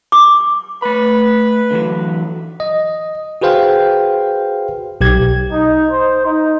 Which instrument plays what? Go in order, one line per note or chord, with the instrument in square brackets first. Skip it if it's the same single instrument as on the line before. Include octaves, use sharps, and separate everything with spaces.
[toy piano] D6
[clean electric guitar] A3 B5 [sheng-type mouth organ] B4
[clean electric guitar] D3 E3 F#3
[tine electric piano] D#5
F#4 G#4 B4 C5 F5 G5
B1 G4 G#6
[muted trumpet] D#4
C5
D#4